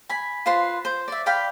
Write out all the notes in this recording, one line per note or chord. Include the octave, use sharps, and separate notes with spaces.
G#5 B5
F4 B4 C5 C6
C5
D5 E5
D5 F5 G5 B5